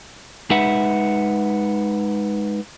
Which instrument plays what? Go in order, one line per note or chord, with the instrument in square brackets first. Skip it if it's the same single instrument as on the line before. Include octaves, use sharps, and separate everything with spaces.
[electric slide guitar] G#3 D#4 B4 E5 F#5